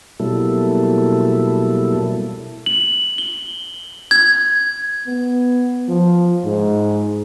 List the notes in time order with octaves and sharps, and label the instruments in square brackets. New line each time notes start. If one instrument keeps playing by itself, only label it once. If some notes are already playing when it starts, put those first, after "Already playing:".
[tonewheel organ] B2 F#3 G3 A#3 E4 A4
[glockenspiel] F#7
G7
G#6
[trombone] B3
F3
G#2